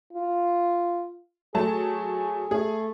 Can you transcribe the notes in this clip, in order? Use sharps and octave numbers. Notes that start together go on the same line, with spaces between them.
F4
F#3 A3 G#4 A5
A3 G#4